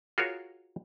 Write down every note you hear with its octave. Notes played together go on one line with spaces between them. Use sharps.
F4 F#4 G#4 A#4 C#5